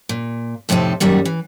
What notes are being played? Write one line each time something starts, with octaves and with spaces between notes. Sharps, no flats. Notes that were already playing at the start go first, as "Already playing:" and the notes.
A#2
F2 A2 C3 C4 D#4
F#2 A#2 D#3 G3 F#4
E3